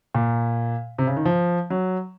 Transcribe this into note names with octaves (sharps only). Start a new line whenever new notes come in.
A#2
C3
C#3
D#3
F3
F#3